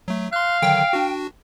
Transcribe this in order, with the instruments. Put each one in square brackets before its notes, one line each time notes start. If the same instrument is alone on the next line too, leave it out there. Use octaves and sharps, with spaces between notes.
[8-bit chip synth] F#3 A3
[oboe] F5 [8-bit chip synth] C6 F#6
[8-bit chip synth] D3 D#3 F#3 [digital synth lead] G5
[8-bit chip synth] D4 F#4